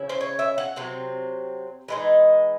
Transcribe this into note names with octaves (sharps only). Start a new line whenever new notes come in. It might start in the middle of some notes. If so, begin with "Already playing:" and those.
Already playing: C#3 C#4 E4
C5
C#5
E5
F#5
C3 F#3 C4
E3 G#3 D#4